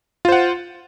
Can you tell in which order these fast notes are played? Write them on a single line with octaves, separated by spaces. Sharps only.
F4 C5 F#5